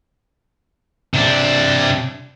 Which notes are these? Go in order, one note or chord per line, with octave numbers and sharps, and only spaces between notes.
C3 D4